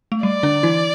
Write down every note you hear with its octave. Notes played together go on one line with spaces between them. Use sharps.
A3
G3 D5
D3 D4
E3 E4